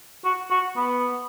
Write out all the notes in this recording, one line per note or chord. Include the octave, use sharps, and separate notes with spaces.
F#4
F#4
B3